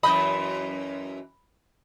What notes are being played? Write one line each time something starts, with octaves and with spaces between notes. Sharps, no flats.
F#2 E3 D#5 B5 G6